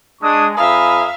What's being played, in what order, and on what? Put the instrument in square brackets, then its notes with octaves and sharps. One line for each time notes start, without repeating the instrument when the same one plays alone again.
[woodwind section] G#3 [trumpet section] D4 C#6 D#6
[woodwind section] F2 A#5 D#6 [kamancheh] E5 F5 [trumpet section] G#5 B5